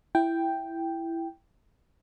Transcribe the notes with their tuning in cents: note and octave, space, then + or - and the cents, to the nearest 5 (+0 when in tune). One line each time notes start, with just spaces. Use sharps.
E4 +10 G5 +0